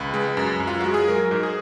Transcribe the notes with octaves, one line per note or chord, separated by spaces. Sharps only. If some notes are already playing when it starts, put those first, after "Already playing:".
Already playing: C#2 B4
G#3
F#2
F#2
F4
G#3 F#4
G#4
F#3 A#4
G#2 A#4
G#4